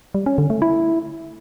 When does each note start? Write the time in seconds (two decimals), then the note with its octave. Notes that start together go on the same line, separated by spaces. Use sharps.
0.15 G3
0.26 C#4
0.38 D3
0.50 A3
0.62 E4